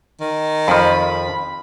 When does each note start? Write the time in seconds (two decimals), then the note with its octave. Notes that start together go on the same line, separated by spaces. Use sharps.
0.21 D#3
0.68 F2 F3 B5